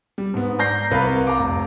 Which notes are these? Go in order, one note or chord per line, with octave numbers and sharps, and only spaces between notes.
G3
G#2 B3
D5 A#5 G6 A#6 C7
C2 A#4 B4 F5 B5
A#5 D6
F1